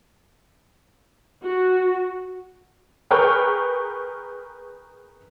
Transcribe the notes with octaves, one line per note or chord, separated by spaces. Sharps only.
F#4
G#4 A#4 B4 G5 C#6 F6